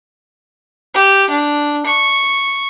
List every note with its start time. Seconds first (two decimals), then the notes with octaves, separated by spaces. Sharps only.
0.94 G4
1.29 D4
1.86 C#6